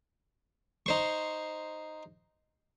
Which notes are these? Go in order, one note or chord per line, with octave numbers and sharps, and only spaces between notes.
D#4 C5 C#6